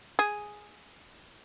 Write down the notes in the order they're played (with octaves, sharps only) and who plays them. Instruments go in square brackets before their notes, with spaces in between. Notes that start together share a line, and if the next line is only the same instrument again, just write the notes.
[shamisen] G#4